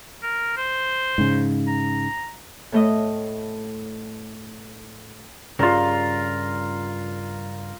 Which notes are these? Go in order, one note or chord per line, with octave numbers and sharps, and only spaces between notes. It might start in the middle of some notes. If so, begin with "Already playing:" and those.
A#4
C5
G#2 C#3
A#5
A2 A3 D#5
G2 C#3 F4 A#4